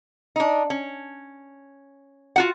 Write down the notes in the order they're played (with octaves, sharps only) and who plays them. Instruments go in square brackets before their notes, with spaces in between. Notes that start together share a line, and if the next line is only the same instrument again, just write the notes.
[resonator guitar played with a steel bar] D4 D#4
C#4
F4 F#4 F#5